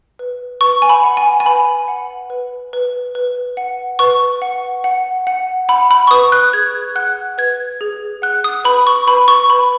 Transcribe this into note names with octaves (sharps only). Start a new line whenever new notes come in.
B4
B4 C#6
G#5
B5
F#5
G#5
G#5
B4 B5
F#5
B4
B4
B4
F#5
B4 C#6
F#5
F#5
F#5
F#5 B5
B5
C#6
B4 D#6
F#6
G#4 G#6
F#5 F#6
B4 G#6
G#4
F#5 F#6
D#6
B4 B5
C#6
B4 B5
C#6
B4 B5